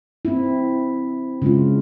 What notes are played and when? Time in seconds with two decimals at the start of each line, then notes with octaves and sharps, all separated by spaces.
0.25 C4 E4
1.42 C#3 G#3 F4